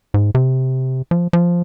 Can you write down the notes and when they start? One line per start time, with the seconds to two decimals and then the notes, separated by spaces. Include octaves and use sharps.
0.14 G#2
0.35 C3
1.11 F3
1.33 F3